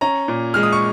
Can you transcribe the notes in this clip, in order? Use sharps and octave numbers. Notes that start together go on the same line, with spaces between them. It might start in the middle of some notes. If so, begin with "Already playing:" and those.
C#4 A#5
A#2
G#3 F6
D#6
C#6